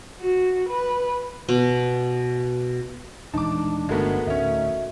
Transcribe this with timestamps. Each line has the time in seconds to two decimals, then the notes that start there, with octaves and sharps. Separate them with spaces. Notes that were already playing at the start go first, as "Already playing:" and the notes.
0.20 F#4
0.69 B4
1.49 B2
3.34 D#1 E3 G#3 D4 D#4 A5 D6
3.89 G1 G#3 A3 B3 F#4 A#4
4.27 D1 D2 C#4 D#4 E5